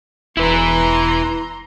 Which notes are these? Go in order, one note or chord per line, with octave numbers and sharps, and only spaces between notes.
E1 E4 B4 A#5 C6